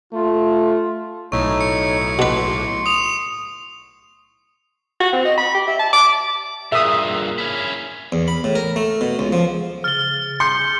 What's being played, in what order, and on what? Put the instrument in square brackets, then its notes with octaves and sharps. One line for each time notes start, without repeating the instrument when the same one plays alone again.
[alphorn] A3 [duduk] F4
[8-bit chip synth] B1 A2 [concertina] D#4 A4 C#5 [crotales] C#6
[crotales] C#7
[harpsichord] B2 B4 [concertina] C6 D6
[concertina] C6
[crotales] D#6 F7
[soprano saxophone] F#4
C4
D#5
B5
G4
E5
A5
D6
[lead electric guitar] G2 A#2 [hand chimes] G#4 A#4 F#6 [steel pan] E5 D#6
[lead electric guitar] C#4 E4
[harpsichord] E2
B5
A2
A#4
A3
B2
C#2
F3
[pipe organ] C#3 A6 [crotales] F6 G7
[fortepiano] C6 [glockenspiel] G6 C#7